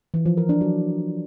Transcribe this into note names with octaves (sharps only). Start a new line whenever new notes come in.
E3
F3
A#4
D4
F#3